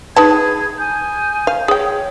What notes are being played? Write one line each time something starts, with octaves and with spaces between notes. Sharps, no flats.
D#4 G#4 B4 A5 B5 G#6
G#5 D#6 G6
F5
G#4 C#5 G5